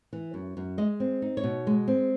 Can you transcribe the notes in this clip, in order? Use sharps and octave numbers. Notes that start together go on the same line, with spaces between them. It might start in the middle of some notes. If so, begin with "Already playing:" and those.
E3
F#2
F#2
G#3 D#5
C4
D#4
C#5
B2
G#3
C4